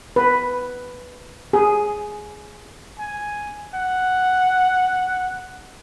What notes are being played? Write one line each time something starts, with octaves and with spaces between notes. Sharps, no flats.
B4
G#4
G#5
F#5